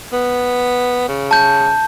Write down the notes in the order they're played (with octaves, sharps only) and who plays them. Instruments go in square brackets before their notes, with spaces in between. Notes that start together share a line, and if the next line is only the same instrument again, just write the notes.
[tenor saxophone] B3
C#3
[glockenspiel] A5 G6